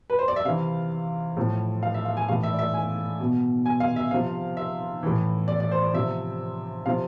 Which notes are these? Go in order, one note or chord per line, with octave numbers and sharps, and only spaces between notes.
B4
C5
D5
E5
C3 E3 F5
A2 F3
F5
E5
F5
G#5
A2 E3 F5
E5
D5
E5
G#5
B2
G#5
F5
E5
C3 F3 F5
E5
A2 E3
D5
D5
C5
D5
C3 F3 E5
C3 F3 F5